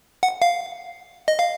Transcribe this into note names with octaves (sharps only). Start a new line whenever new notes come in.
F#5
F5
D#5
F5